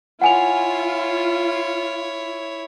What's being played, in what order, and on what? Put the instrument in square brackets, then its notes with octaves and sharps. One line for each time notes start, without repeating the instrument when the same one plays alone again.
[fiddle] E4 C#5 [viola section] F4 [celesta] F#5 G#5 F7